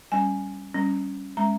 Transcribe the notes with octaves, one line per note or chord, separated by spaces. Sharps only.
G3 C#4 G#5
G3 C#4
G#3 C#4 A#5